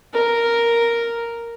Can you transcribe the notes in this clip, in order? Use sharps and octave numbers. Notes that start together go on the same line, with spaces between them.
A#4